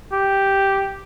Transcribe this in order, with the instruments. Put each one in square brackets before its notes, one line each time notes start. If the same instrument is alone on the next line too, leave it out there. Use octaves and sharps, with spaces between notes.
[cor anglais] G4